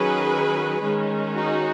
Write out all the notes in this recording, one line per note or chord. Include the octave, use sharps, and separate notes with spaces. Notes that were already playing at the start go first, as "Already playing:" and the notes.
Already playing: D#3 F#3 C#4 G#4 B4
D#3 G#3 C#4
D#4 F#4